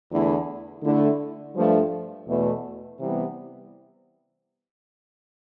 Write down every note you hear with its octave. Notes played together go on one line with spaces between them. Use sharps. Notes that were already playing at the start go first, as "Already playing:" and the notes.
E2 D3 A3 E4
D3 A3 E4
G2 F3 A3
E2 B2 A3
C3 E3 G3 B3